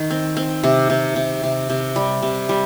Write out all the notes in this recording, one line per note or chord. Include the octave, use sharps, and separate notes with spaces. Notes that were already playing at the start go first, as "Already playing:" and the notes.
Already playing: D#3
C4
C4
C3
C3
C3
C3
C3
G3
C3
G3